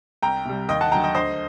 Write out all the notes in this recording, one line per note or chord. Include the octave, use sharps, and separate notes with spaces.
C2 G5 A#5
C3 G3
D#2 D#5 G5
F#5 A5
D3 F#3 G5 A#5
D#5 G5
D2 C5 D#5